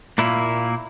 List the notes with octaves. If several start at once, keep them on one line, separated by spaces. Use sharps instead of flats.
A#2 A#3 E4